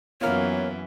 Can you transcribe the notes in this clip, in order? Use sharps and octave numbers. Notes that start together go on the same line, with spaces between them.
F#2 E3 A#3 B3 F4 C#5 F6